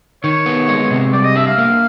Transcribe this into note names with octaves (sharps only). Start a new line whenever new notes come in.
D#3 C#5
B3
G#3
C3
G3 D5
D#5
D4 E5
F5
A#3